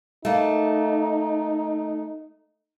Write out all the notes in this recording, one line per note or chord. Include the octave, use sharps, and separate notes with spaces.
A3 A#3 D#4